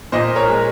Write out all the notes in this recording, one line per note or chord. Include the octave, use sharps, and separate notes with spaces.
A#2 C5 D#5
A#4 C#5
G#3